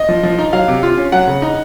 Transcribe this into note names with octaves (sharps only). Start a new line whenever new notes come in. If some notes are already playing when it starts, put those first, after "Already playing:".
Already playing: D#5
F3
F3
D#4
F#3 F5
C3
F4
C#4
F#3 F#5
C#3
D#4